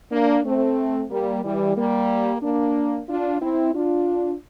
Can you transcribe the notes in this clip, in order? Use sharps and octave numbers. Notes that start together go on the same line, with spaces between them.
A#3 D4
A3 C4
G3 A#3
E3 G3
G3 A#3
A#3 D4
D4 F4
C4 E4
D4 F4